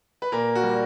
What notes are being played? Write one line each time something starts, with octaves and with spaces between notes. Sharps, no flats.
B4
A#2 A#3 A#4
F#4
G3